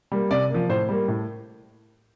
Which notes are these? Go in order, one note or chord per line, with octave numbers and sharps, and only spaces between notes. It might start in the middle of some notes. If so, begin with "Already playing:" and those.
G3 A#3
C3 D5
F3 A#3
A2 C5
G3 A#3
A2